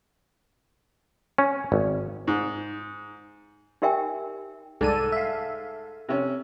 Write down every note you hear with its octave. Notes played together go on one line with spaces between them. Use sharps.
C#4
G#1
G#2
D#4 G4 A#4 E5 G5 G#5
C2 G#2 A4 D5 D#7
E5 F5
C3 C#4